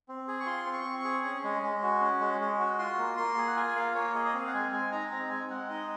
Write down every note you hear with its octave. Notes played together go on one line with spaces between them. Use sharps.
C4
G#4
C#6
F4 C6
C4
C#6
C4
C#6
G#4
C#4
G#3
G#3
F#4
C#4
G#3
G#3
F#4
F4 C6
A#3
A#3 C6
G#4
F#5
F4 G#5
A#3 F5
A#3 C#5
G#4 D#5
D#5
C4 F5
F#5
G#3 G#5
G#3 G#5
D#4 A#5
C4 A#5
G#3 G#5
G#3 F#5
D#4 D#5